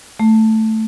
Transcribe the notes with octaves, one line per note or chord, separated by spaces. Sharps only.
A3